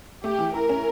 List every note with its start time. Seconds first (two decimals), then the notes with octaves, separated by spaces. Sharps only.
0.24 A3 G4
0.39 E3
0.54 E4 A#4
0.69 C#4